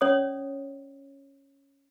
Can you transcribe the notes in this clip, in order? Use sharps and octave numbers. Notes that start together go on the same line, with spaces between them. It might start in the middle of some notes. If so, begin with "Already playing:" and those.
C#4 C#5 D5 D#6